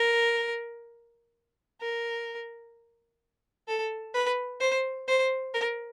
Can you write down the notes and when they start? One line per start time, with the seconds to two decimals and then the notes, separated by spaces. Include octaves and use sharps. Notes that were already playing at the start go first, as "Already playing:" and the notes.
Already playing: A#4
1.81 A#4
3.68 A4
4.14 B4
4.60 C5
5.08 C5
5.54 A#4